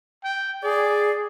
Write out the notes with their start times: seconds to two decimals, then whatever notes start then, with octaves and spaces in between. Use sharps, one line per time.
0.24 G5
0.63 G#4 D5